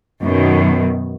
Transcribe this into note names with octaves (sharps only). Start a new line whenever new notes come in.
F#2 B2 D#3